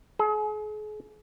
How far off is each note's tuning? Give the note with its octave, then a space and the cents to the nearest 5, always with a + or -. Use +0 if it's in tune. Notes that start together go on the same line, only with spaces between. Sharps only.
G#4 +40